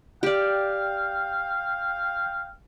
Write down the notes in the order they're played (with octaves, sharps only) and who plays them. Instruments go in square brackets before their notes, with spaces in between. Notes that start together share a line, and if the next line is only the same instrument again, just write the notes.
[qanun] G4 D5 [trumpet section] F5 G5